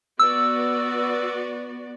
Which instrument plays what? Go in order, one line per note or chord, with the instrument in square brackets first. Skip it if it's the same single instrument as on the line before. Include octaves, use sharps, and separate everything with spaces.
[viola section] B3 F#4 D5 [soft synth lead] E6